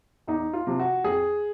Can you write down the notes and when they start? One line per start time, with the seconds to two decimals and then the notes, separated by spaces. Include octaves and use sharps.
0.27 E2 D#4
0.53 F4
0.67 C3 F3
0.79 F#4
1.04 F2 G#4